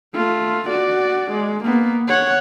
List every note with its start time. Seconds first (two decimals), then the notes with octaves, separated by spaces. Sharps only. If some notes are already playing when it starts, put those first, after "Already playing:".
0.14 A3 F4
0.70 F#4 D5
1.32 G#3
1.64 A#3 B3
2.08 C#5 F#5